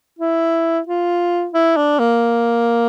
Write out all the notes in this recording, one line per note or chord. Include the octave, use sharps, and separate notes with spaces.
E4
F4
E4
D4
A#3